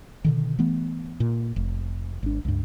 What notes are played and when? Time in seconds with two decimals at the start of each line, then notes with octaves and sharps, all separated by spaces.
0.24 B2 D3 D#3
0.59 E3 A3 B3
1.20 A#2
1.56 F1
2.23 G#1 D4
2.45 C#2 G2